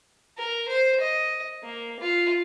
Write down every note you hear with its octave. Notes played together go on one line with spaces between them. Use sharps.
A#4
C5
D#5
A#3
F4